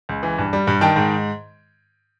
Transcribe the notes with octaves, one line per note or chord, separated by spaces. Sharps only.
C#2
E3
G2
G3
G2
D#3 G5 A5
G#2